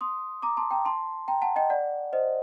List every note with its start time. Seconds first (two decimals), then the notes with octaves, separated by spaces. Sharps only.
0.01 C6 D#6
0.42 A#5 D6
0.57 A5 C6
0.71 G5 A#5
0.85 A5 C6
1.28 G5 A#5
1.42 F#5 A5
1.56 D#5 G5
1.70 D5 F#5
2.13 C5 D#5